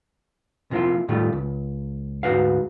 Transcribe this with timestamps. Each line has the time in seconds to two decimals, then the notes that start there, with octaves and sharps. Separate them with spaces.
0.71 C3 F3 A#3 E4 F4
1.08 A2 D#3 G3 A3 F4
1.33 C#2
2.23 D2 G#2 E3 F#4 B4 F5